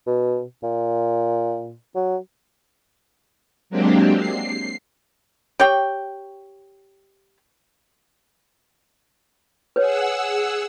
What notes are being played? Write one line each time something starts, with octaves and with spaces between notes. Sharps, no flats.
B2
A#2
F#3
F#3 G#3 A#3 C4 D4 G4
C7
G4 C#5 G5
G#4 B4 C#5 F#5 E6